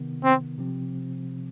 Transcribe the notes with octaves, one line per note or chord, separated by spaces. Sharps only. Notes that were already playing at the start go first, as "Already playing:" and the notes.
Already playing: C3 D#3 B3
C4
C3 F3 C4